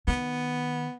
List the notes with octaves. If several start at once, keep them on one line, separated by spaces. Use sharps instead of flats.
D#3 B3